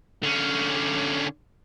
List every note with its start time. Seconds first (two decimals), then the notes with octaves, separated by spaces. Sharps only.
0.23 D3 C#4